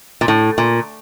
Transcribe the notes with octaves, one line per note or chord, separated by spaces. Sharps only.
A#2
A2
A#2